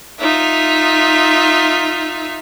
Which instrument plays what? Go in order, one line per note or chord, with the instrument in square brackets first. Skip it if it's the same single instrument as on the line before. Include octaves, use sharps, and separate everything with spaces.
[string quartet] D#4 F4 E5